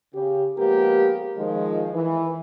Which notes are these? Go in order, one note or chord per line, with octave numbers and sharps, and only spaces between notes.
C#3 G4
F3 G#3 A#3 B3 G4 A#4
D#3 F3 G#3
E3